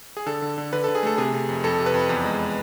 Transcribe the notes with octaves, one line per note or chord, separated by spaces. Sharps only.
G#4
D3 A4
D3
D3
D3 B4
D3 A4
G#4
A3 A4
C3 G#4
C3
F2
F2 A4
C3
B4
F2
E2
G#3